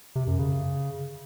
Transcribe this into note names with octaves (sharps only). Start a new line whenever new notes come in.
C3
F#2
C#3